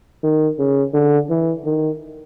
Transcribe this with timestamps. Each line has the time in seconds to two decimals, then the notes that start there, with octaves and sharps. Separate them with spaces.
0.23 D#3
0.59 C#3
0.94 D3
1.30 E3
1.65 D#3